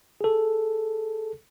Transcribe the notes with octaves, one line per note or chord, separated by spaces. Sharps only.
G#4 A4